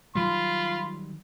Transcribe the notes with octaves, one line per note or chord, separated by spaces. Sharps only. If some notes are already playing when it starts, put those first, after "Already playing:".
D#3 F#3 G3 F4 B5 C6